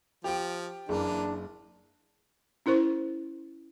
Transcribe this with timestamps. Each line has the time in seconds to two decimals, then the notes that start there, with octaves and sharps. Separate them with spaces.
0.24 F3 G4 G5
0.89 F#1 E3 A#3 D4 G#4
2.66 C#4 E4 A#4 C5 C#6